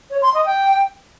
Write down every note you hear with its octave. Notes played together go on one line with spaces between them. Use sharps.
C#5
C6
D#5
G5